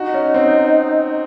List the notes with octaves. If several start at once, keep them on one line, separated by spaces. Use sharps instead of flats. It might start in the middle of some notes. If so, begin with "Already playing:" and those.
Already playing: D#4 F#4
C#4
C4